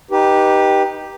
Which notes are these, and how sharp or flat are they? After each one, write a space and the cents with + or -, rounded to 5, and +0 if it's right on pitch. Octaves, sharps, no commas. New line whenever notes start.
D#4 +0 G4 +0 B4 -25